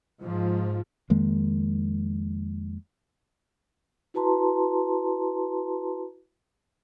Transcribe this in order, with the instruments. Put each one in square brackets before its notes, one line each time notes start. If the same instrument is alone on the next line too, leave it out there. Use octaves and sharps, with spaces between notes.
[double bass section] G#2 F3
[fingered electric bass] F2 D#3 G#3 A#3
[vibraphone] E4 F#4 B4 A5 A#5 C6